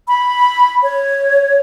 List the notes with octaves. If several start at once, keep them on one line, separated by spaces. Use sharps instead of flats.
B5
C#5